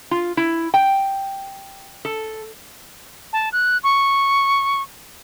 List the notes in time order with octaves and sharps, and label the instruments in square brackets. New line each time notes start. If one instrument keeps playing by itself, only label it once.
[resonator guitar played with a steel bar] F4
E4
G5
A4
[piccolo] A5
F#6
C#6